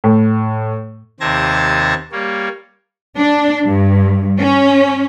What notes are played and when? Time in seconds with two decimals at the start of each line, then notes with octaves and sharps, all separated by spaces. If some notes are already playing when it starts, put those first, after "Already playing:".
0.04 A2
1.20 D#2 C3 C4 A5 G#6 A#6
2.12 G3 A#3 C#5
3.17 D4
3.65 G2
4.38 C#4